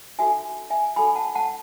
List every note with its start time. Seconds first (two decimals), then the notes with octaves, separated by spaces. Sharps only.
0.19 D#4 F#4 A4 E5 G#5
0.70 E5 G#5
0.96 D#4 F#4 A4 G#5 B5
1.15 F#5 A5
1.35 F#5 A5